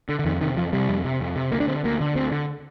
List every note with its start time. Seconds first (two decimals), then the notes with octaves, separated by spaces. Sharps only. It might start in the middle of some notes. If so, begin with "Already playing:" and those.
0.09 D3
0.19 D3
0.25 F2 D#3
0.41 C3 D#3
0.56 F2 F3
0.73 C3 G3
0.89 F2
1.04 C3
1.20 F2
1.36 C3
1.52 D2 A#3
1.60 D4
1.67 D3 C4
1.84 D2 A#3
2.00 D3
2.15 D2 C4
2.31 D3